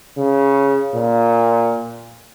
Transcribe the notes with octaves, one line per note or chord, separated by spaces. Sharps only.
C#3
A#2